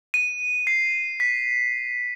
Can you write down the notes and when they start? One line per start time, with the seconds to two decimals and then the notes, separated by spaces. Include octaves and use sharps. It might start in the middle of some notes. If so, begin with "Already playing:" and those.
0.14 D#7
0.67 C7
1.20 B6